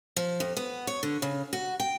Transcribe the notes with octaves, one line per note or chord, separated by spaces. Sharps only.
F3
F2
B3
C#5
D3
C#3
F#4
G5